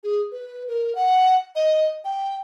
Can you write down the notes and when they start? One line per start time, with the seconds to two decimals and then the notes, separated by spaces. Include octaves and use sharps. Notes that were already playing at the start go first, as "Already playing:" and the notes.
0.04 G#4
0.32 B4
0.68 A#4
0.95 F#5
1.55 D#5
2.04 G5